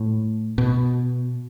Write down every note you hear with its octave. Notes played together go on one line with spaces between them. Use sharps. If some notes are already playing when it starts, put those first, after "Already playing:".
Already playing: A2
B2